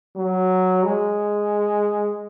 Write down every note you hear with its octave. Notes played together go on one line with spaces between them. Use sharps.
F#3
G#3